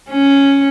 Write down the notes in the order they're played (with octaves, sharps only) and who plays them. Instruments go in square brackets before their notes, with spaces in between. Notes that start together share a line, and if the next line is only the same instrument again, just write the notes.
[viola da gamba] C#4